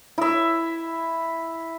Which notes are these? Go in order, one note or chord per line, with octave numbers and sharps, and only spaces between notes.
E4 E5